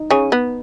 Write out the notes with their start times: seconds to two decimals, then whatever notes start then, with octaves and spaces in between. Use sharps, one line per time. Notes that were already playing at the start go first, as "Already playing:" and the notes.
Already playing: D#4
0.11 C#3 C#4
0.32 B3